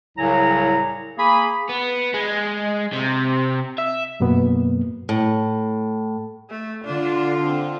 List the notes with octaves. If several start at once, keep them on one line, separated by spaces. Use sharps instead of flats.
C2 A2 C#3 F#3 G#5 A#5
A#3 G#4 B5
B3
G#3
C3
E5
F#2 B2 F#3 A#3 B3
A2
A3
D3 D4 F4
C4